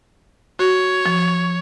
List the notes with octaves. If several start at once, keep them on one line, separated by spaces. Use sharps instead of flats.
F#4 C#5
F3